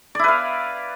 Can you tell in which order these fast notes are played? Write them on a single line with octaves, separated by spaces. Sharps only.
D5 E4 B4 F5